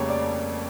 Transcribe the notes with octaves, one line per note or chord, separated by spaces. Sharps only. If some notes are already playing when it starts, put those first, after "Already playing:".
Already playing: F1 F2 C#3 G3 A#3 A#4 C#5
D5